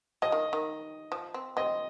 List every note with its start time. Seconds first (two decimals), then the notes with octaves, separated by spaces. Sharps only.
0.22 F3 D#5
0.32 D#3
0.53 D#3
1.12 F3
1.34 C4
1.57 C4 D#5